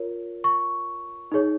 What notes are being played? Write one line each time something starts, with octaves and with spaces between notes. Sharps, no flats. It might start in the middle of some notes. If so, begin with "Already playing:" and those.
Already playing: F4 A#4 C#5
C#6
D#4 G#4 C#5